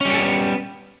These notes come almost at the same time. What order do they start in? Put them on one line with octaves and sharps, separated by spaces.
C#4 G3 C#5 A4 B3